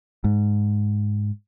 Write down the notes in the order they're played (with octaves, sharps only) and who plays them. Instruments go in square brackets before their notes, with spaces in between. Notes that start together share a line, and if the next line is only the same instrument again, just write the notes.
[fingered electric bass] G#2